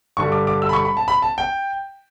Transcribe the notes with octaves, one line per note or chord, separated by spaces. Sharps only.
G2 D3 G3 C#6
D6
D6
E6
B5
C#6
B5
A5
B5
A5
G5